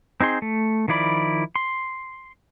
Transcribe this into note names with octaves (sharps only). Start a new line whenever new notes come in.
C4 D#4 G#4 C6
A3
D#3 F3 E4 D5 B5
C6